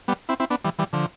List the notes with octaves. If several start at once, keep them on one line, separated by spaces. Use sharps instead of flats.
G3 B3
C4 E4
C4 E4
B3 D4
E3 G3
E3 G3
D3 F3